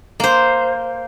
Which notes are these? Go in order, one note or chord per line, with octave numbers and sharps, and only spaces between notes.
A#3 C5